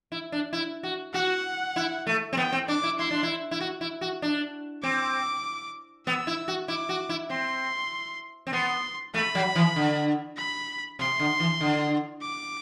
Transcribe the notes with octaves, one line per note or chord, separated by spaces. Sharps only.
E4
D4
E4
F#4
F#4 F#5
E4
A3
C4
B3 G5
C4
D4 D6
E4
E4 C6
D4
E4
E4
F#4
E4
F#4
D4
C4 D6
B3 E6
E4
F#4
E4 D6
F#4
E4
C4 C6
C4
B3 C6
A3 B5
F#3
E3
D3
B5
C3 C6
D3
E3
D3
D6